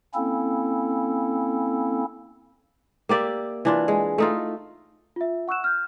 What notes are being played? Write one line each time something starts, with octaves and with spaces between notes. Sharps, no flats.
A#3 C4 C#4 E4 A4
A#3 G4 D5 E5
E3 D4 F4
G#3
A3 D#4 F4
F4 E5
F#5 C#6 E6 F#6 E7
F6 G6